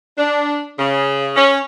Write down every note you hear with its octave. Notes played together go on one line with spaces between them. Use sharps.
D4
C#3
C#4